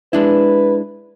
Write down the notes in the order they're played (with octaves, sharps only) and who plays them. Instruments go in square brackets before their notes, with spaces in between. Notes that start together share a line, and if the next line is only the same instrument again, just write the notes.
[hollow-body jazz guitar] G#3 D4 E4 [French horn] B4